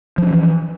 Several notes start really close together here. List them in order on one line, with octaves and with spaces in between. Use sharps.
F3 D4 C#4 E3